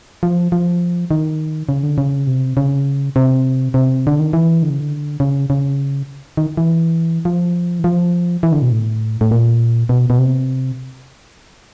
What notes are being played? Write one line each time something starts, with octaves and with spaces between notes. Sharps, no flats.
F3
F3
D#3
C#3
D3
C#3
C3
C#3
C3
C3
D3
D#3
E3
D3
C#3
D3
C#3
C#3
D#3
E3
F3
E3
F3
E3
D3
B2
A2
A2
A#2
B2
B2
C3